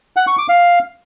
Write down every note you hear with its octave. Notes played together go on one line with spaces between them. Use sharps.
F#5
C#6
D6
F5